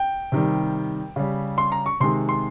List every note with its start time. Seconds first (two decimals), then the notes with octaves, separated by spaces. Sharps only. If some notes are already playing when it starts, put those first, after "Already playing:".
Already playing: G5
0.32 C3 D#3 G3
1.16 C#3 G3
1.58 C6
1.72 A#5
1.86 C#6
2.00 C3 D#3 G#3 C6
2.29 C6